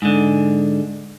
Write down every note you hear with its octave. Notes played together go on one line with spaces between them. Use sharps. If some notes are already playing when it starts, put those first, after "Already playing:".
G#2 D3